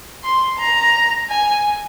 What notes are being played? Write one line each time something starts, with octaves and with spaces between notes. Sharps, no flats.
C6
A#5
G#5